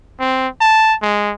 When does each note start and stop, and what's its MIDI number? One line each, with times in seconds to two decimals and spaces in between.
0.19 0.48 60
0.61 0.95 81
1.02 1.33 56